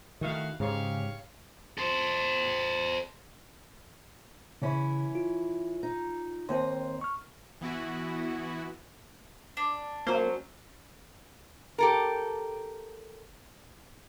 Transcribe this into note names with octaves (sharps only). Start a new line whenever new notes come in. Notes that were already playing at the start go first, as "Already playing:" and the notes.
D#3 A3 E4 F#4 F5
G#2 C#3 G4 C#5 F5
A4 C5
C#3 E3 C#4 E4 B5
F4
D#4
D#2 C4 D#5 C6
C#6 F6
E3 B3 E4 F#4
D4
F#3 A#3 C#4 C5
G4 A4 A#4